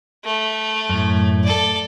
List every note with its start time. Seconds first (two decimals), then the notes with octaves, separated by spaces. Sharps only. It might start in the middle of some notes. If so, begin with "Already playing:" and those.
0.25 A3
0.89 F#2 A2
1.43 A4 D5